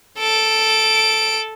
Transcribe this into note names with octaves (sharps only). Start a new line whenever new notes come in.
A4 D7